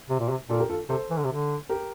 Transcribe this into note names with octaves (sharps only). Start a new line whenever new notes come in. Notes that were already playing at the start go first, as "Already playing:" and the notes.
C3
A#2
C3
A#2 F4 A4
G4 A#4
F4 A4
C3 A4 C5
E3
D3
C3
D3
G4 A#4